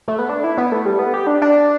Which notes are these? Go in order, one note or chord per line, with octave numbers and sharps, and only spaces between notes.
A3
B3
D4
E4
B3
A3
G3
B3
G4
D4
D4